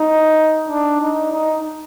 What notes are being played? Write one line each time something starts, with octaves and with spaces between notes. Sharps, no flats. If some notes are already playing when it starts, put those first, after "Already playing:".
Already playing: D#4
D4
D#4
D#4